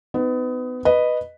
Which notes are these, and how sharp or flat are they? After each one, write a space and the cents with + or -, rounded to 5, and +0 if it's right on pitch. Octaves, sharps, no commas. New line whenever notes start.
B3 +30 D#4 +0
B4 +0 D#5 -10